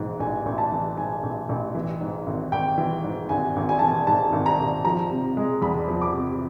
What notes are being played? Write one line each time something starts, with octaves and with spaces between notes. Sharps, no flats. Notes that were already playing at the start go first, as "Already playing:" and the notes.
Already playing: A1 G#2 E3
A1 G#5
A1
A5
E3
G#2 G#5
A1
A1
E3
G#2
G#1
G#1 G5
E3
G#2
G#1 G#5
G#1
G#5
E3 A5
G#5
G#2 A5
G#1
A#5
G#1
F3 A#5
C3
G#3
E2 B5
F3
D6
C3